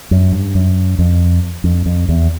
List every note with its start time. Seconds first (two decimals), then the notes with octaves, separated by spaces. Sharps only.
0.11 F#2
0.32 G2
0.55 F#2
0.99 F2
1.64 F2
1.86 F2
2.09 E2